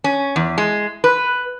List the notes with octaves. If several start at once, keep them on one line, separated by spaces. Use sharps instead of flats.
C#4
E2
G#3
B4